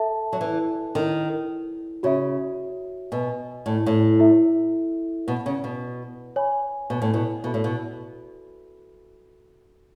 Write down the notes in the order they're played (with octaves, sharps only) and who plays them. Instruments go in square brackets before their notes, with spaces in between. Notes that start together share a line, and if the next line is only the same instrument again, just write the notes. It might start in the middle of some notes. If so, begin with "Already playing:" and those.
Already playing: [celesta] A4 E5 A5
[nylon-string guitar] F#3
E3
[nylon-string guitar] D#3 [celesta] E4 A4 C#5
[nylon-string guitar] C#3 [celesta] F#4 C#5 E5
[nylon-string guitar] B2 [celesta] B4 D#5 G#5
[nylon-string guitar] A2
A2
[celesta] E4 A4 E5
[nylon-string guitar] B2 [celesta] B4 F#5 B5
[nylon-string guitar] C#3
B2
[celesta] C#5 G#5 B5
[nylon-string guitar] B2
A2
B2
[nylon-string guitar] B2 [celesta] F#4 A4 E5 B5
[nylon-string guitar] A2
B2